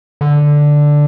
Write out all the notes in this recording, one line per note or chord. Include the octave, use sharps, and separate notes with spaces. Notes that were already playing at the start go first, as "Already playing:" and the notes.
D3